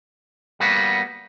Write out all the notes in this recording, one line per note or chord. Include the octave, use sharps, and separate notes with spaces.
G3 A#3 B3 F#4